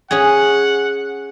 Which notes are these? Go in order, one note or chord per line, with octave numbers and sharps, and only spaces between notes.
C#4 G#4 F#5